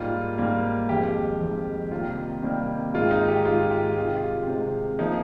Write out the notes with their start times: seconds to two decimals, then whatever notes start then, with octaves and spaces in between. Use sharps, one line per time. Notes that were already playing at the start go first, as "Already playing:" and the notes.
Already playing: G#2 G3 A#3 F4
0.38 G#2 G3 A#3
0.89 F2 D#3 G#3 G4
1.40 F2 D#3 G#3
1.91 C3 D#3 G3 A#3 F4
2.42 C3 D#3 G3 A#3
2.94 G#2 D#3 G#3 F4
3.11 D#4
3.28 G4
3.45 G#2 D#3 G#3 F4
3.70 G4
3.96 C3 D#3 G#3 F4
4.07 G4
4.16 F4
4.47 C3 D#3 G#3
4.99 F3 A#3 D#4